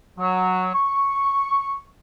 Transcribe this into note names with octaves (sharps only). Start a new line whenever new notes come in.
F#3
C#6